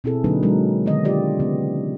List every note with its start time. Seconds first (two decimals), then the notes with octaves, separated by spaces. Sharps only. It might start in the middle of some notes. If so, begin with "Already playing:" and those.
0.04 B2 C4 E4 G#4 A4
0.24 D3 F#3 A#3 D4 D#4 B4
0.43 F#3 G#3 A#4
0.86 D3 D#3 B3 D#5
1.05 F4 G4 D5 D#5
1.40 C#3 B3